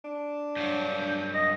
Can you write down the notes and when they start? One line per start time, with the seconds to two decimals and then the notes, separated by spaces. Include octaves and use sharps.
0.05 D4
0.56 G2 F#3 G6
1.34 D#5 A#6